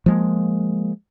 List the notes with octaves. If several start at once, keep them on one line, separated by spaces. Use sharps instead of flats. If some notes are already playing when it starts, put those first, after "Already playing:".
F3 G#3 A#3